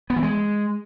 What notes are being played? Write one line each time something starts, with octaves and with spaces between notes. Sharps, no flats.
B3
E3
G#3